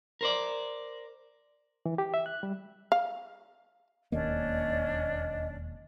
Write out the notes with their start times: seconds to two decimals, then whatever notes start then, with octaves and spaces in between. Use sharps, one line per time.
0.21 A#4 C5 D5
1.86 E3
1.98 G4
2.14 E5
2.26 F#6
2.43 G3
2.92 F5
4.12 E1 D#2 A#3 C#4 D4 D5 D#5